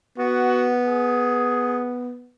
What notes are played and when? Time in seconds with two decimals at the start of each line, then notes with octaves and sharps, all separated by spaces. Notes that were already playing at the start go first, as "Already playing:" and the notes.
0.18 B3 F#4
0.88 G#4